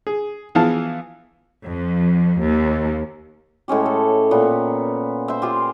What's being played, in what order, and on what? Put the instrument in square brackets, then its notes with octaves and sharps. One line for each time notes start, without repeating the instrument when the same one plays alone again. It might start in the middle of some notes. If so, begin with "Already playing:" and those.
[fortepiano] G#4
E3 F3 B3 G#4 F5 A5
[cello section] F2
D#2
[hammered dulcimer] A2 G#3 C#4 G4
A4
A#2 B3
C5 E5
F4 G4 G#4